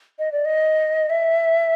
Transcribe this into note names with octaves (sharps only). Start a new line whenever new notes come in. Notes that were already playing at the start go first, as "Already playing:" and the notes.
D#5
D5
D#5
E5